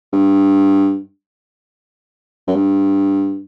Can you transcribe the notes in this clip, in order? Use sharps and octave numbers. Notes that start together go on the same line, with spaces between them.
G2
F#2
G2